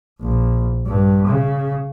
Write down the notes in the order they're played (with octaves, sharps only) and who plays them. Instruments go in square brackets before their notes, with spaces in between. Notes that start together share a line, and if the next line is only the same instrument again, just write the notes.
[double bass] A#1
G2
C#3